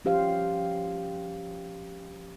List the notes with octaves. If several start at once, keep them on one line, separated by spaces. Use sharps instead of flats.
F3 C#4 G4 C5 F5